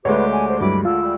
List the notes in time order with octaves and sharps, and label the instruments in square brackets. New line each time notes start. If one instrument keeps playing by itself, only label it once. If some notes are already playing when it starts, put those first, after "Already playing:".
[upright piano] D2 G#3 A3 [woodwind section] D4 F#4 G4 [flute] B4 [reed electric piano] C#5
[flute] G#5
C5
[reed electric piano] G2 F#3 G3 [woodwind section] E3 D6 [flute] B5
[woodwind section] D3 [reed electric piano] F4 [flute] E6
[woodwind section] G3